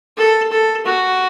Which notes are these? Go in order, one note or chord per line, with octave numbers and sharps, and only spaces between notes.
A4
A4
F#4